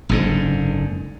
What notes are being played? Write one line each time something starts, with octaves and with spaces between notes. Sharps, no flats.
F#1 G#2 D3